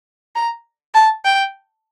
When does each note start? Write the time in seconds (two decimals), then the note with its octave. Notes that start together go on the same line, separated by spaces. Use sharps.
0.35 A#5
0.95 A5
1.25 G5